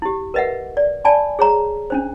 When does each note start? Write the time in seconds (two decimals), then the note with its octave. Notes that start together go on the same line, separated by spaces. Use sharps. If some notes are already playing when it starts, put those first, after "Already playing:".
0.02 E4 G4
0.34 A#4 B4 D#5 E5 F#5
0.77 D5
1.05 D5 G#5 A5 B5
1.39 G#4 C#5 A#5
1.90 C#4 D4 C5